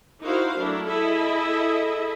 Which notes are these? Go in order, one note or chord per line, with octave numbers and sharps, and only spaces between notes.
D#4 E4 F#4 A#4 C5 F5
F#3 A3 D4 E4 A#4
E4 G#4 A4 D#5 E5